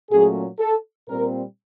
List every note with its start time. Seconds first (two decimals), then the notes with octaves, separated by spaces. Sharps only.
0.11 A#2 F#3 A3 C#4 G#4
0.59 A4
1.08 A#2 G3 C4 A#4